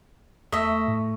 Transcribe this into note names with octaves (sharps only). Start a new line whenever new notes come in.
E2 A3 D#5 E5
A2